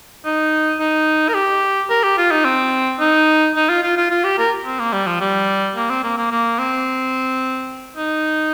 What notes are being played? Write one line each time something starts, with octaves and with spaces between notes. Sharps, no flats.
D#4
D#4
A#4
G4
A#4
G4
F4
D#4
C4
D#4
D#4
F4
F4
F4
F4
G4
A#4
C4
A#3
G3
F3
G3
A#3
C4
A#3
A#3
A#3
C4
D#4